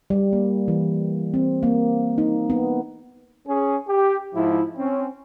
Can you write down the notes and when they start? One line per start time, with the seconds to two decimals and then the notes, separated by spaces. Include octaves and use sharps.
0.10 G3
0.33 A#3
0.68 E3
1.34 C4
1.63 A#3
2.18 D#4
2.50 B3
3.48 C#4 G#4
3.88 G4
4.35 G#2 F3 E4
4.77 C4 C#4